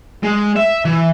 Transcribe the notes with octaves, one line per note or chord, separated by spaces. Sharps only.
G#3
E5
E3